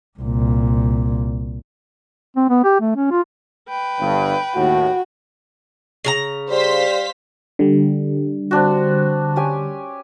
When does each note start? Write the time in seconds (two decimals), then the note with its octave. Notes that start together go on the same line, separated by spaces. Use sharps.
0.20 C2 A#2
2.36 C4
2.49 B3
2.64 G4
2.80 A3
2.96 C#4
3.11 F4
3.69 B4 G5
4.00 G1 G2
4.56 D#2 A2 F#4
6.05 C#3 G#4 A#5
6.50 G3 C5 F5 B6
7.59 D3 G3
8.51 C4 D4 F#4
9.36 C#4 G4 G#5